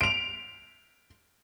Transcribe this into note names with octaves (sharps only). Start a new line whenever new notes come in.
D7 F7